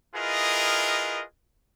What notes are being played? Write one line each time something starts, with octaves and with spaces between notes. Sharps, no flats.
E4 F4 G#4 A#4 B4 D#5